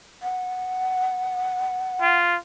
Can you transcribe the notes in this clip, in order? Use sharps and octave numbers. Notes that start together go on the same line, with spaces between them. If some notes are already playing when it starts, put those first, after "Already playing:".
F#5
F4